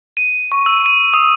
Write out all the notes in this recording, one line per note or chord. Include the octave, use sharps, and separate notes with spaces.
D#7
C#6
E6
D#7
D#6